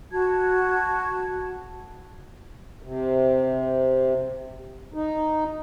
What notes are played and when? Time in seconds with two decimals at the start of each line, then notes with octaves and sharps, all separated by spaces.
0.12 F#4 A5 G#6
2.83 C3
4.94 D#4